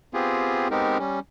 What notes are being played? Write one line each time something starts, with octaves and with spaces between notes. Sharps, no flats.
B3 C4 F4 G4 G#4
G#3 B3 C4 D#4 G4 A#4
G3 C#4